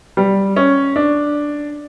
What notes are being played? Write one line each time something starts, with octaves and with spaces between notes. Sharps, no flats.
G3
C#4
D4